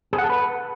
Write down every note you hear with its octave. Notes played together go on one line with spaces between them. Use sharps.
G#4
F#5
A4
B4